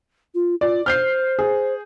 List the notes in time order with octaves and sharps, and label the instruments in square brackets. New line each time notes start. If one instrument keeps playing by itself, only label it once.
[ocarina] F4
[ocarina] F4 [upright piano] D5
[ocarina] C5 [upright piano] F6 G6 C7
[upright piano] G#4